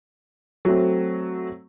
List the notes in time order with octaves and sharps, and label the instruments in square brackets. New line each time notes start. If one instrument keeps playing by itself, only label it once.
[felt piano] F#3 A3 C4